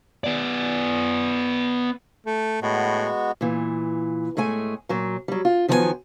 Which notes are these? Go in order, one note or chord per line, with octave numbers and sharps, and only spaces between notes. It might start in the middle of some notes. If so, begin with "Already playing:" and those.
B3 D5
A3
A2 G#3 B3 F#4
A#2 E3
A2 G#3 A3 G#5
A#2 F#3
F#3 G3
F4
D#3 F3 F#3 B3 A#4 G#5